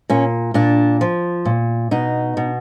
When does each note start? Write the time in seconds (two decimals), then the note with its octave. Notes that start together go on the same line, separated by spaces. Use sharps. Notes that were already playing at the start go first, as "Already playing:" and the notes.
0.10 A#2 C#4
0.54 A#2 D4
1.01 F3
1.45 A#2
1.91 B2 D#4
2.37 B2